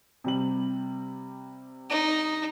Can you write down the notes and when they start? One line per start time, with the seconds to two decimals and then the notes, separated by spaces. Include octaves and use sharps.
0.24 C3 G3 F#7
1.90 D#4